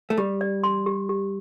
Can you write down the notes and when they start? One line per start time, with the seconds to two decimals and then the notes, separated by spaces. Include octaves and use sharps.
0.10 A3
0.17 G3 G4
0.41 D5
0.64 C6
0.86 G4
1.09 G4